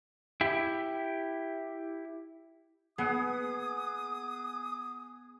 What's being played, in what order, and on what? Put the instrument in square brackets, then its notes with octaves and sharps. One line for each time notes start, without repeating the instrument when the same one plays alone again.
[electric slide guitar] E4 G4
[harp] B3 [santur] G#4 F#5 [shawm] D#6